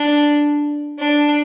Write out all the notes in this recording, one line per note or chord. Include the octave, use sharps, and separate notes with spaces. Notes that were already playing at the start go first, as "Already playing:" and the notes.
Already playing: D4
D4